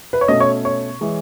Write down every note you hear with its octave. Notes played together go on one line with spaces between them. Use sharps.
B4
C#5
B2 A3 C#4 D#5
C#5
C#5
E3 G#3